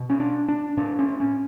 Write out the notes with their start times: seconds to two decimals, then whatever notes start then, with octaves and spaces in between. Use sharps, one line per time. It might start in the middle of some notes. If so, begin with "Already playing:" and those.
Already playing: B2
0.10 C#4
0.20 D4
0.49 D4
0.77 A2 D4
0.99 C#4
1.20 C#4